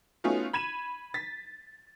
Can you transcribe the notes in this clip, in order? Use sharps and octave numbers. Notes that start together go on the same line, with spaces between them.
A3 B3 C#4 D#4 F4 F#4
B5 G#6 D#7 E7
A6 B6